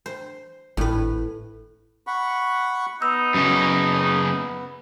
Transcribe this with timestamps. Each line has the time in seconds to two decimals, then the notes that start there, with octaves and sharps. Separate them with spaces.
0.06 C5
0.77 G#1 A2 B4
2.07 F#5 B5 C#6
3.02 B3 D#4 E6
3.34 F#2 C#3